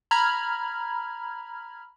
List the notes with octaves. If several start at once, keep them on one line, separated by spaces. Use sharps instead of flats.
A#5 B5 F6 G#6